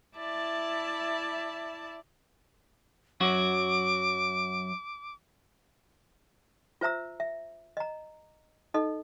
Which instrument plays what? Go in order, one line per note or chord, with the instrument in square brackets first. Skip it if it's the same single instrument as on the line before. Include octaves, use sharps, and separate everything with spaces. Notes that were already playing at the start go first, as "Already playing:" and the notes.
[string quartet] E4 D5 E5 A5
[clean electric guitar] F#2 F#3 F#4 [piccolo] D6
[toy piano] F4 C5 E5 A#5 E6
E5
D#5 A#5
D#4 A4 D#5